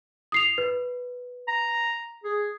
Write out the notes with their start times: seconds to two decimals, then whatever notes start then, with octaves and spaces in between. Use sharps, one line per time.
0.32 D#6 C7 F7
0.58 B4
1.48 A#5
2.24 G#4